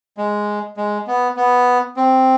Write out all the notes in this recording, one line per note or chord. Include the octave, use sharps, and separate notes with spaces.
G#3
G#3
B3
B3
C4